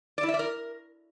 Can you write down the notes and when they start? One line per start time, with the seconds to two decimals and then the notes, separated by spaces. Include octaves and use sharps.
0.18 D5
0.23 E4
0.29 E5
0.34 D5
0.39 A#4